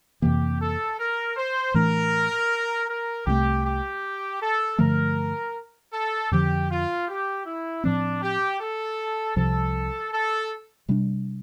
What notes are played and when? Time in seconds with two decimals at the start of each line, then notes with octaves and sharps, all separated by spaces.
0.22 F2 C3 E3 A#3 G4
0.60 A4
0.98 A#4
1.37 C5
1.74 A2 E3 A3 D4 A#4
2.88 A#4
3.26 C2 C3 E3 A3 G4
3.64 G4
4.41 A4
4.78 G2 D3 F3 A3 A#4
5.93 A4
6.31 F2 D3 F3 G4
6.70 F4
7.08 G4
7.45 E4
7.83 A2 F3 C4 D4
8.22 G4
8.60 A4
9.36 C2 C3 F3 A4
10.12 A4
10.89 C3 G3 D4